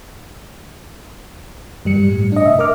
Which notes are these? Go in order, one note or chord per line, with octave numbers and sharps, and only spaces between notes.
G2 G3 C#7
A2
D4 D#5
C3 E5
A#4 D#5 D6 F6